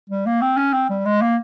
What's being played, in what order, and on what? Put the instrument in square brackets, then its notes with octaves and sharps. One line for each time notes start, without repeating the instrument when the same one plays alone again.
[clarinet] G3
A#3
C4
C#4
C4
G3
G#3
A#3